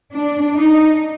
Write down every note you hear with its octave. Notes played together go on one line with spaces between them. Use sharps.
D4
D#4